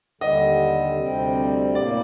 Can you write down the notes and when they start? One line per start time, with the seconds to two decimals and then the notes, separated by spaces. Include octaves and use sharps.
0.21 D#2 D3 G3 D#5
0.98 D2 C3 G3 C4
1.75 A2 G3 A#3 D5